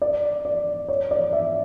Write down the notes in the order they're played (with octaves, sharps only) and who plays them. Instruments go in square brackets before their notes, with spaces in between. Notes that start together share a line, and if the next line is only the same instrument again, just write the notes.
[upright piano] D5
D5
C#5
D5
E5